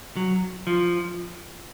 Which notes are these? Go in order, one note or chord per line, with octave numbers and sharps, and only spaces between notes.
F#3
F3